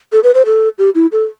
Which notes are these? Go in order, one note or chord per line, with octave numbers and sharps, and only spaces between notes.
A4
B4
C5
A4
G4
E4
A4